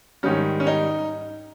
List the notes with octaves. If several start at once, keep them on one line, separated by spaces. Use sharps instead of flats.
G#2 D#3 G3 C#4
C#4
D#4